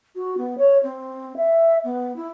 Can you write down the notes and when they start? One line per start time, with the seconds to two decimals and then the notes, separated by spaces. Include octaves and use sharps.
0.16 F#4
0.38 B3
0.58 C#5
0.83 C4
1.36 E5
1.84 B3
2.16 E4